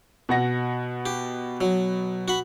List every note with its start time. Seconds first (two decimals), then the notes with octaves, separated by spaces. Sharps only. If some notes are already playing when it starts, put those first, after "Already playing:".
0.29 B2 F#5 A#6
1.06 G4
1.61 F#3
2.28 F#4 B5